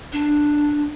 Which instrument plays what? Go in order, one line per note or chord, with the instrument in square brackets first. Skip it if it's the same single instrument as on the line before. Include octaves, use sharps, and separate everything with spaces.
[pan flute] D4